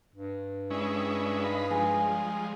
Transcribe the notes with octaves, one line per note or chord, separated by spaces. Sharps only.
G2
G3 G#3 C#4 E4 G#4
D#4 F5 B5
F3 G#3 G#5